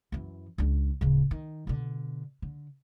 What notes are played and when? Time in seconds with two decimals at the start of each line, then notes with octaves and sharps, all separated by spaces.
0.12 F#2 E3
0.58 C#2 D4
1.01 D1 C#3
1.31 D#3
1.67 B2 D3
2.42 D3